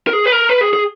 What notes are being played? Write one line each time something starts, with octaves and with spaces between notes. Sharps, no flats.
A#4
G#4
B4
A#4
B4
G#4
G#4